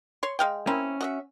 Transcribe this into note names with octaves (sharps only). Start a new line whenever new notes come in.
C#5 C6
G#3 F5 G5
A#3 C4 C#4 E4
F#4 D#5 E5